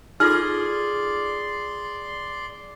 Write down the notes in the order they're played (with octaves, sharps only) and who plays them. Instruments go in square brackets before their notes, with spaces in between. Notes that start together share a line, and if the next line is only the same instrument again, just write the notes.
[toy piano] D#4 F4 A4 [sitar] G#4 [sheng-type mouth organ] D5 C6 [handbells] F6